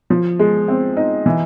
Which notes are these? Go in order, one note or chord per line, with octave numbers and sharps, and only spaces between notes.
F3
G#3
C4
D#4
E3